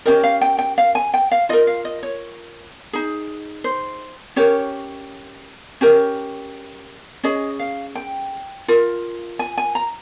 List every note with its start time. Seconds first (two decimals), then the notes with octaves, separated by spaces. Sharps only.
0.05 C#4 G4 A#4 D#5
0.24 F5
0.41 G5
0.59 G5
0.78 F5
0.95 G#5
1.14 G5
1.31 F5
1.49 F4 A#4 D#5
1.67 F5
1.85 D#5
2.03 C#5
2.93 D#4 G#4
3.64 C5
4.36 C#4 G4 A#4 C#5
5.81 C#4 G4 A#4
7.23 C#4 G#4 D#5
7.59 F5
7.95 G5
8.68 F4 A#4
9.39 G#5
9.58 G#5
9.75 A#5